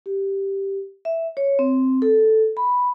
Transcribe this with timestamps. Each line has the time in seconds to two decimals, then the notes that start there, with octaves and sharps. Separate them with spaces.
0.06 G4
1.05 E5
1.37 C#5
1.59 C4
2.02 A4
2.57 B5